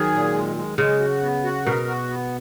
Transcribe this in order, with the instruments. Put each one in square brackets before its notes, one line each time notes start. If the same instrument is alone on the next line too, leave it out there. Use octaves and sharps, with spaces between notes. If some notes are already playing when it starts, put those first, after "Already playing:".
Already playing: [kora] D#3 F#3 [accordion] G#4
[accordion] A#2
G#3
G#3
[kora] C#3 [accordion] G#3
[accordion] F#4
B3
F#4
[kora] B2 [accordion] A#4
[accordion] F#4
B3